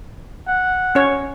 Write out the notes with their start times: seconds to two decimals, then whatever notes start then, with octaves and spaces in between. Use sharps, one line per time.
0.48 F#5
0.95 C#4 C#5